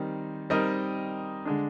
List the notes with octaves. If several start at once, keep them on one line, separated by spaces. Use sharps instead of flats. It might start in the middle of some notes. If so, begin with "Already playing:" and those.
Already playing: D#3 G3 C4 D#4
G3 C4 D#4 A#4 D#5
D3 G#3 D4